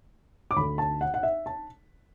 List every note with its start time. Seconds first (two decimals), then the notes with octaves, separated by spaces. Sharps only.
0.51 D6
0.56 D2 D3 B5
0.78 A5
1.01 F#5
1.14 F#5
1.23 E5
1.46 A5